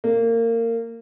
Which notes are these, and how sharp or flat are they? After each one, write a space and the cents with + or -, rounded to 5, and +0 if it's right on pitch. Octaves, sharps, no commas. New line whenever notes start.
A#3 -25